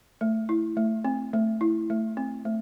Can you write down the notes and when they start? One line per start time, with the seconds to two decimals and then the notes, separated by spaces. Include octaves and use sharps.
0.21 A3
0.49 E4
0.77 A3
1.05 C4
1.34 A3
1.61 E4
1.90 A3
2.17 C4
2.45 A3